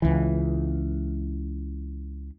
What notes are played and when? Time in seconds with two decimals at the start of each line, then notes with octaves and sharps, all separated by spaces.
0.02 C#2 E3